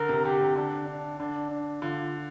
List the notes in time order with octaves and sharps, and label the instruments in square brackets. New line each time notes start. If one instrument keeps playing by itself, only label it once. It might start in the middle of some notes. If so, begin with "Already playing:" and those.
Already playing: [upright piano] D3 [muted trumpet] A#4
[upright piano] C3
[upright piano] D3 [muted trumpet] G4
[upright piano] C3
[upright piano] D3 [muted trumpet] D4
[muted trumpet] D4
[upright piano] D3 [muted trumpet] D4
[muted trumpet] D4
[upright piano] D3 [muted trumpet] F4